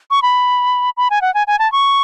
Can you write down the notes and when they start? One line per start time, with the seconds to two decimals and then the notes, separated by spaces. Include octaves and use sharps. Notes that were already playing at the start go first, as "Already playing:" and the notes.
0.11 C#6
0.22 B5
0.97 B5
1.10 G#5
1.22 F#5
1.34 G#5
1.47 G#5
1.59 A5
1.72 C#6